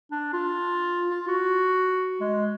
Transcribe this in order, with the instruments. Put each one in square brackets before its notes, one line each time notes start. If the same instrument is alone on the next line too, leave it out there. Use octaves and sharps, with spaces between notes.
[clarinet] D4
F4
F4
F#4
G#3